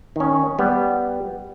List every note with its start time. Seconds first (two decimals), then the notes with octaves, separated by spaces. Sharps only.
0.16 D#3 C#4
0.58 G3 B3